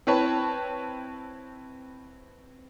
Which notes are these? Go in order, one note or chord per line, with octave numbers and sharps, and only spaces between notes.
C4 E4 B4 C#5 A5